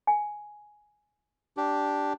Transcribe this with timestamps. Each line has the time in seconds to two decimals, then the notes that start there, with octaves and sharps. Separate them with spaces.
0.07 G#5
1.57 D4 G4